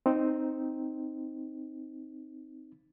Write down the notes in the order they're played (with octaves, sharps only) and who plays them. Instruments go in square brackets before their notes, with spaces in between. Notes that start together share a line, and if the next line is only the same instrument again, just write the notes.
[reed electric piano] C4 D#4